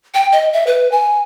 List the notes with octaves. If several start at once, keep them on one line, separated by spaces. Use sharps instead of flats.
G5
D#5
E5
B4
G#5